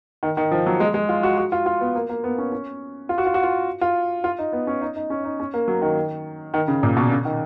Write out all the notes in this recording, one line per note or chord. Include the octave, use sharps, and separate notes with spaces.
D#3
D#3
F3
F#3
G#3
G#3
F4
F#4
F#4
F4
F4
B3
A#3
A#3
B3
C#4
C#4
F4
F#4
F4
F#4
F4
F4
F4
D#4
B3
C#4
D#4
D#4
C#4
D#4
C#4
A#3
F#3
D#3
D#3
C#3
A#2
B2
C#3
D#3